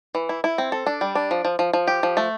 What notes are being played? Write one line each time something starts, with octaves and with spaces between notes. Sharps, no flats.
E3
E4
E4
C4
A4
D4
G3
D4
F3
F3
F3
F3
G4
F3
A3